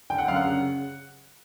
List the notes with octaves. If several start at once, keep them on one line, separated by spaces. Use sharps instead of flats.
D3 G5
F#5
F#2 F5
F#5
C#3